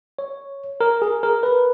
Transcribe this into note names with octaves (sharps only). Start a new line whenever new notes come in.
C#5
A#4
G#4
A#4
B4